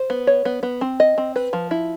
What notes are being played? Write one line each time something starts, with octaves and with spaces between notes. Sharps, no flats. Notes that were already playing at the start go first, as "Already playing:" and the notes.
Already playing: C5
B3
C#5
B3
B3
C4
D#5
C4
B4
F3
E4